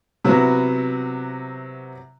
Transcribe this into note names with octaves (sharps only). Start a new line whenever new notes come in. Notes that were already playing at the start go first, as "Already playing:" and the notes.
C3 F#3 B3 E4 F#4